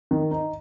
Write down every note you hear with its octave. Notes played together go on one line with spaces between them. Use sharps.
D#3
D#4